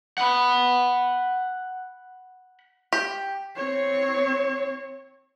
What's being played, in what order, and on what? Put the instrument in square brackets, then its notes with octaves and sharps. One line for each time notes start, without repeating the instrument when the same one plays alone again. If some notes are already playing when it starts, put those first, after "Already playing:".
[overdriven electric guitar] F#5 B5
[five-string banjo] G4
[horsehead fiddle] C4 C#5